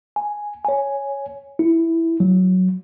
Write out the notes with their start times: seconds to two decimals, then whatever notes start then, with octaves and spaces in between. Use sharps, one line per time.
0.16 G#5
0.65 C#5 G#5
1.59 E4
2.20 F#3